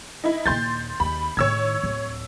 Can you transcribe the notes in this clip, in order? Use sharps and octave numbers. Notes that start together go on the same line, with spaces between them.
D#4 E4
D#2 A#2 C6 G6 A6
D#2 B5
A2 D#3 C#5 E6 G#6
D1